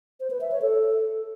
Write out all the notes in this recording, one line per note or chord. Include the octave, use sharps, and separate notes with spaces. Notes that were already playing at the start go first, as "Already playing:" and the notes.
C5
B4
E5
C#5
A4